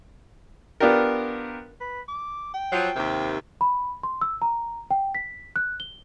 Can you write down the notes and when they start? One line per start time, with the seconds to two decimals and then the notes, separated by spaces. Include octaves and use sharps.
0.80 B3 D4 F4 G4 A#4
1.80 B4
2.08 D6
2.54 G5
2.72 F3 F#3
2.96 D#2 C3
3.61 B5
4.03 C6
4.21 E6
4.42 A#5
4.91 G5
5.15 B6
5.56 F#6
5.80 G7